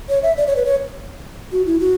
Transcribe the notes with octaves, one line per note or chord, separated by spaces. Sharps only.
C#5
E5
D5
C#5
B4
C#5
F#4
E4
F#4